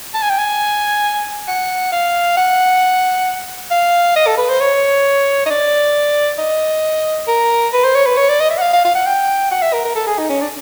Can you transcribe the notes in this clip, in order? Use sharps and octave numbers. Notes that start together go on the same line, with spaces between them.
A5
G#5
G5
G#5
F#5
F5
F#5
F5
D#5
A4
B4
C5
C#5
D#5
D5
D#5
A#4
B4
C5
C#5
B4
C#5
D5
D#5
E5
F#5
F5
F5
F5
F#5
G5
F#5
E5
A#4
A#4
A4
G#4
D#4
C#4
D4